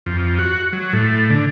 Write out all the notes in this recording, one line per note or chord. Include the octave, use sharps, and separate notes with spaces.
F2
F#4
F#3
A2
D3